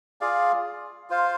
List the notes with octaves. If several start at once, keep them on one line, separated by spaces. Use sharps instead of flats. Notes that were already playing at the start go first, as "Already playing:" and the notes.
F4 G#4 D5 F5
F4 C5 F5